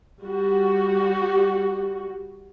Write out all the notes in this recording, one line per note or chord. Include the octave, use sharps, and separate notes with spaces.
G3 F#4